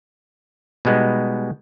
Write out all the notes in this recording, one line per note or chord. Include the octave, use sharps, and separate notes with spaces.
B2 G3 G#3 B3 D#4